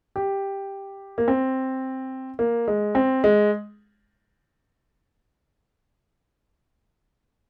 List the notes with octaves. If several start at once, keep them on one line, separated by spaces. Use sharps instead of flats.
G4
A#3
C4
A#3
G#3
C4
G#3